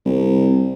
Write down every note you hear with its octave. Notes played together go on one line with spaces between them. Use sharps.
C2